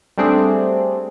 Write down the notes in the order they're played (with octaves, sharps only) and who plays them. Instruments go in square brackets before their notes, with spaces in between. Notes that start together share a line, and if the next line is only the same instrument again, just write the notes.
[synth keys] G3 A3 C4 D4 G#4